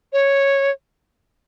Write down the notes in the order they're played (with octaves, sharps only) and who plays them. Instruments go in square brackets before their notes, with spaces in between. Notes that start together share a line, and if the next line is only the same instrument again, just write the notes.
[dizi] C#5